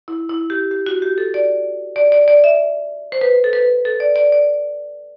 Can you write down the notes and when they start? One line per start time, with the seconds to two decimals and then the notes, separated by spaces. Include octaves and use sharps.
0.08 E4
0.29 E4
0.50 G4
0.71 G4
0.86 F#4
1.02 G4
1.18 A4
1.34 D5
1.96 D5
2.12 D5
2.28 D5
2.44 E5
3.12 C5
3.21 B4
3.44 A4
3.53 B4
3.85 A4
4.00 D5
4.16 D5
4.32 D5